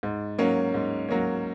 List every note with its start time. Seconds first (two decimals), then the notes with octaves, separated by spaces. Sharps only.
0.03 G#2
0.38 F#3 A#3 C#4
0.74 G#2
1.09 F#3 A#3 C#4